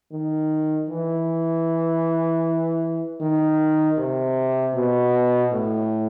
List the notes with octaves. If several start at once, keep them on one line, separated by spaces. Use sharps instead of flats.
D#3
E3
D#3
C3
B2
A2